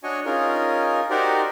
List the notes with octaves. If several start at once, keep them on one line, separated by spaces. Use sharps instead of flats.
D4 F#4 C#5 D#5 G#5 C#6
C#4 D#4 F4 G#4 A#4
D#4 F#4 G4 A#4 C5 D5